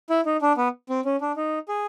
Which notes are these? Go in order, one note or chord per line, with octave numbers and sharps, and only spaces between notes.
E4
D#4
D4
B3
C4
C#4
D4
D#4
G#4